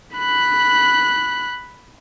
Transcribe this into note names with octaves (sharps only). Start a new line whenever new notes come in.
B5 F#6